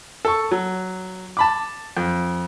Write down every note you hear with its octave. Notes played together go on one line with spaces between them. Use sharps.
A4 C#6
F#3
A5 B5 D6
F2